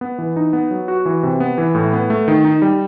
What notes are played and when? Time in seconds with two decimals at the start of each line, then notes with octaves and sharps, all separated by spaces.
0.01 B3
0.18 E3
0.36 D#4
0.53 B3
0.71 F#3
0.88 F#4
1.06 E3
1.23 C3
1.40 B3
1.58 E3
1.75 A2
1.93 B3
2.10 A3
2.28 D#3
2.45 D#4
2.62 G3